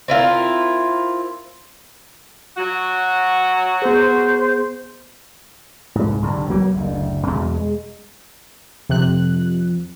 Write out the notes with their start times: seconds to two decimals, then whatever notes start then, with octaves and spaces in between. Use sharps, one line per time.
0.08 C4 E4 F4 A#4
2.57 F#3 F#4
3.82 B3 G#4 C5
5.95 C2 G#2
6.22 B1 G2 D3
6.50 F#3 A#3 B3
6.74 F#1 D2
7.26 E2 B2 G#3
7.54 G#3
8.89 F2 C3 F#6